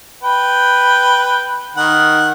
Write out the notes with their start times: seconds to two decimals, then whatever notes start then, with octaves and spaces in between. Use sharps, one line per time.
0.23 B4 G5
1.77 D#3 F#5